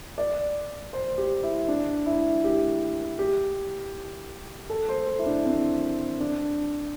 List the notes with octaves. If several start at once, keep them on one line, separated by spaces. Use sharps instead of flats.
D5
C5
G4
E4
D4
E4
G4
G4
A4
C5
A4
E4
D4
C4
D4